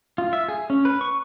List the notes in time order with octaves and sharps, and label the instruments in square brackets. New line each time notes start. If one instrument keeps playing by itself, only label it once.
[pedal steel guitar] F4
E5
G#4
C#4
B4
C#6